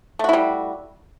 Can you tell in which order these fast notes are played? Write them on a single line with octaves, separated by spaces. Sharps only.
A3 F#4 E4 G3